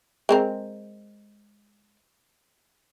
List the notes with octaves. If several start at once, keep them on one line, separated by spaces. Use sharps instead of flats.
G#3 C4 A#4